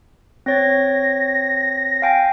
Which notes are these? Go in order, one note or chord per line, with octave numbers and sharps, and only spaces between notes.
C4 C#5 A6 A#6
F5 G5 G#5